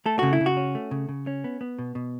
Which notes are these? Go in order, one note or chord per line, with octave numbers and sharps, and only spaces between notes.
A3 A4
C#3 F#4
E4
C#3
F#4
C#4
A3
C#3
C#3
C#4
B3
B3
B2
B2